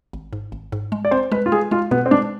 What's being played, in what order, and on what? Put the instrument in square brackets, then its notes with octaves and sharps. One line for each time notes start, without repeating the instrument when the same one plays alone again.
[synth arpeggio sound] G#1
G#2
G#1
G#2
G#3
[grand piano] D5
[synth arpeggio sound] C4 [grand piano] C5
[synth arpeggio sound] G#3 [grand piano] B4
[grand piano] F4
[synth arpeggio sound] G#3 [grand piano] G#4
[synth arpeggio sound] G#3 [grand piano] F4
[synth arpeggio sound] B2 [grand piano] B3
[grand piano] C4
[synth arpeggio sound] G#3 [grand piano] D4